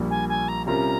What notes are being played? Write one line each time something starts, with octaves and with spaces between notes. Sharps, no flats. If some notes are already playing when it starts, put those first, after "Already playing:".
Already playing: A#1 A#2 G3
G#5
G#5
A#5
C3 G3 C#4 F4 A#4 A#5